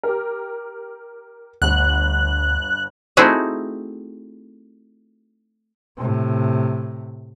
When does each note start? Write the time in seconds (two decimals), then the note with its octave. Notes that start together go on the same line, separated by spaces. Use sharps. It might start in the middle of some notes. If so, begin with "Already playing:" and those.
0.03 G4 A#4
1.62 G1 D2 F#5 F#6
3.17 A3 C4 D#4 E4 F#4 G#4
5.97 A2 C3